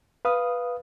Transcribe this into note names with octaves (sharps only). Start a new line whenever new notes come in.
B4 F5 D#6